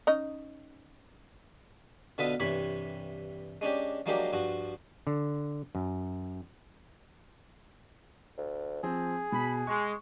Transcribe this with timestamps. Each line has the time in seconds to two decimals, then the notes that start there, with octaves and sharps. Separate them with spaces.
0.07 C#4 D#4 D#5
2.18 B2 D3 F4 B4 E5 D#6
2.40 G2 C3 E3 C#5 B5
3.61 G#3 C#4 D4 G4
4.06 F3 F#3 G#3 A#3 D4 G4
4.33 G2 F3 F#4
5.07 D3
5.75 F#2
8.38 D2
8.83 F3 C4 G#4
9.32 B2 B5
9.67 G#3 C#6